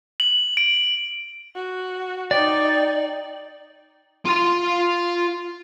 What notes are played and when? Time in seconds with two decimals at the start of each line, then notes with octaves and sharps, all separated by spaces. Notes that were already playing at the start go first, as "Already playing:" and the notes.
0.20 F#7
0.57 D7
1.56 F#4
2.31 D#4 D5 G5
4.25 F4 C6